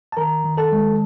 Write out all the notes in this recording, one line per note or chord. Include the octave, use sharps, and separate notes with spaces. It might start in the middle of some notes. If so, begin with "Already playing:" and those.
A5
D#3 A#4 A#5
D#3
A4 A5
G#3